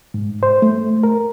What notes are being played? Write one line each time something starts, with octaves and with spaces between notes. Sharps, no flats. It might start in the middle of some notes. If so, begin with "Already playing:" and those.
G#2
C5
A3
A#4